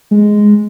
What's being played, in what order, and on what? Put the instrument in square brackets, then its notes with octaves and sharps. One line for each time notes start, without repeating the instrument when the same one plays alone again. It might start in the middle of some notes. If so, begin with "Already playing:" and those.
[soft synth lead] G#3